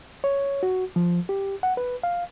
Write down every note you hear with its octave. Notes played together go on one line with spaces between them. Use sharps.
C#5
F#4
F3
G4
F#5
B4
F5